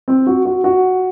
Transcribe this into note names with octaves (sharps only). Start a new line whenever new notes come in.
C4
F#4
F#4
F#4